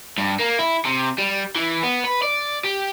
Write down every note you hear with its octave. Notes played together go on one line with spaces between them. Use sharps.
G2
A#3
E4
C3
G3
E3
B3
B4
D5
G4